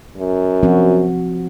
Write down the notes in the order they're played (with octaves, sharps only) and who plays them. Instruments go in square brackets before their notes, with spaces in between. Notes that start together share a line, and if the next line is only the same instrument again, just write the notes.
[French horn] F#2
[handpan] F3 C4 F#4